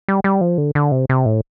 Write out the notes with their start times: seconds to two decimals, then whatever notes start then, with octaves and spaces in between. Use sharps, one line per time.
0.08 G3
0.24 G3
0.41 F3
0.58 D3
0.75 D3
0.92 C3
1.09 C3
1.26 A2